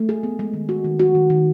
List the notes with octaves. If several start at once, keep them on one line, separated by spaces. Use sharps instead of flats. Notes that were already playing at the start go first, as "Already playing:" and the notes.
Already playing: A3
G#4
B3
G#3
D#3
F#4
D#3
F#4
D#3
D#3